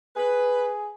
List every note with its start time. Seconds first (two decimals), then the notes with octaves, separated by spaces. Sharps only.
0.16 G#4 B4